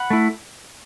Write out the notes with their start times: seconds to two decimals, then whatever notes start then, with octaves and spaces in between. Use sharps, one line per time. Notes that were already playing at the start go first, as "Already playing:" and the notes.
Already playing: F#5 B5
0.10 A3 E4